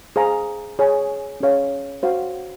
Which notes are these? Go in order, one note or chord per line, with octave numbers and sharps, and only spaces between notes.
G#4 C5 F5 A#5
G#4 C#5 G#5
C#4 G#4 C#5 F5
F#4 C5 F5